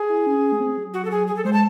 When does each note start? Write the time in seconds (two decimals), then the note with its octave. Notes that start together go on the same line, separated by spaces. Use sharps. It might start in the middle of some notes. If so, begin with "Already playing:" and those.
Already playing: G#4
0.09 E4
0.27 C#4
0.52 A3
0.60 C4
0.77 F#3
0.94 F#4
1.05 A4
1.11 G#4
1.27 G#4
1.36 A4
1.45 G#3 C5
1.53 A5